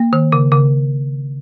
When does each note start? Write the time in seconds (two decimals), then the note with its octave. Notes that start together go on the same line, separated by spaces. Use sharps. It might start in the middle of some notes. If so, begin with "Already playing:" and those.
Already playing: A#3
0.13 D#3
0.32 C#3
0.52 C#3